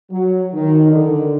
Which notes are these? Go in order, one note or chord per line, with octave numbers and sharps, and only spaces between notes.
F#3
D#3
D3